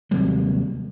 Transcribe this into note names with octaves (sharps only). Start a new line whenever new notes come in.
D#2 C3 F#3 G3